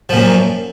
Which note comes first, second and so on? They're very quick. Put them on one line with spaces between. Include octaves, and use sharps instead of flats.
F3 A#2 F#2